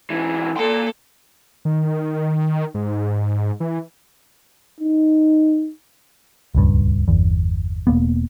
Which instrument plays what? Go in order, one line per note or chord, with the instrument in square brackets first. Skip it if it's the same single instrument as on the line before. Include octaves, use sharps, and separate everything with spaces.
[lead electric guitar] B1 E3
[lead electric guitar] A#3 C6 [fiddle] A4
[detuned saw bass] D#3
G#2
E3
[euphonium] D#4
[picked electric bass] D#1 C#2 G2
G1 E2
E1 F#2 A#3 B3